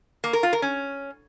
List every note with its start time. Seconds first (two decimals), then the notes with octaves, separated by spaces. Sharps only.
0.24 A#3
0.33 A#4
0.43 F4
0.53 A#4
0.62 C#4